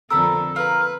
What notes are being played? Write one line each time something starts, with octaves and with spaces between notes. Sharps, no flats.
F2 D3 A4 A#4 A5 B5 E6
F4 A#4 B4